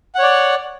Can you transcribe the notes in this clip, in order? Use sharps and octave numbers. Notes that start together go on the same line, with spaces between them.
C#5 D5 F#5